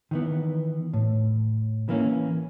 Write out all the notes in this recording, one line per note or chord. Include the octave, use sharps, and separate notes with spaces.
D#3 E3 B3
A2
E3 A#3 C#4